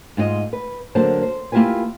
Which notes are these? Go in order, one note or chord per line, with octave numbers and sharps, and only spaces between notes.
G#2 F4 F#4 D#5
B4
D3 F#3 A#3 C5 A5
C5
A#3 E4 F4 G4 B4 G#5